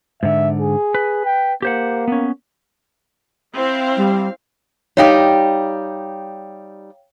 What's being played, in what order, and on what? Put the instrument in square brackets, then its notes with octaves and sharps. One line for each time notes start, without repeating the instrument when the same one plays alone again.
[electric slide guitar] G#2 D3 [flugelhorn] E5
[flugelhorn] G#4
[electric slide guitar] B4
[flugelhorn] G5
[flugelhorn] A#3 [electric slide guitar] G4 C5 F#5
[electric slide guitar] B3 C#4
[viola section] C4 E4 F5
[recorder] G3
[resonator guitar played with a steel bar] G3 D#4 G4 [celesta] C#5 F5 G5